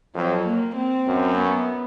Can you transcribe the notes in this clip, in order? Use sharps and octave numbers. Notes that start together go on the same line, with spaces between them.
F2 F#3
A#3
C4
F#2
B3